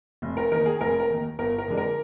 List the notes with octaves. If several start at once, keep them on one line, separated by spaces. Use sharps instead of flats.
F1
A#4
D#2 D#3 A#4
G#4
F1 A#4
A#4
D#2 D#3
G1 A#4
A#4
F2 D3 G#3 D4
A#4